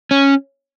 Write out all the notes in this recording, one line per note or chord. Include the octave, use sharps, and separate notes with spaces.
C#4